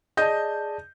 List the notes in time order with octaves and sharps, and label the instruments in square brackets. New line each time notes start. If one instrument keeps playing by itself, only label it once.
[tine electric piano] G#4 D5 A5 [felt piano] D#5 G6